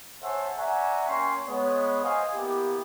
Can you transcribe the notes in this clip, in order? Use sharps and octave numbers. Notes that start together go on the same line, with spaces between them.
A4 C5 C#5 E5 F#5 G#5
D5 E5 F#5 G#5 A#5 C#6
A#3 C#4 G5 G#5 C6 C#6
G#3 B3 C#5
C5 D#5 F5 F#5 G#5
A#3 B3 E4 G4